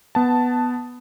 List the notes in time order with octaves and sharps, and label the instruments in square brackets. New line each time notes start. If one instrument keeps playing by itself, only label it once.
[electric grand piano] B3 A5